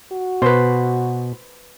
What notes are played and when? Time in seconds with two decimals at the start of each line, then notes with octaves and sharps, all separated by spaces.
0.12 F#4
0.42 B2 B4 C5